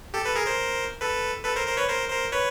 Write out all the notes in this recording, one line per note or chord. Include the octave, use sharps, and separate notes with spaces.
G4 A4
A4 B4
G#4 A#4
A#4 C5
A4 B4
A4 B4
A#4 C5
A#4 C5
B4 C#5
A#4 C5
A#4 C5
B4 C#5